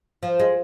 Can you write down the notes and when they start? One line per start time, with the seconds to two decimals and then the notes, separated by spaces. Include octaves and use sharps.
0.23 F3
0.39 G#3